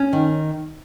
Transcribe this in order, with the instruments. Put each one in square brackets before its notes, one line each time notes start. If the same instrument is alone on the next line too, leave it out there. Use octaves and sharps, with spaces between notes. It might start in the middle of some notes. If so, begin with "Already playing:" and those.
Already playing: [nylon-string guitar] C#4
D#3